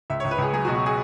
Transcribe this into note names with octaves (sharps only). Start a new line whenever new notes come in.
C#2 E5
C#2 C#5
B4
C#2 G#4
F#3 G#4
F#4
B2
F#4
G#4